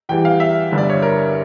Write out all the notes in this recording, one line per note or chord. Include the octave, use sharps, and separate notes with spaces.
E2 E3 G3 G5
F5
E5
G1 G2 D3
D5
C#5
A#4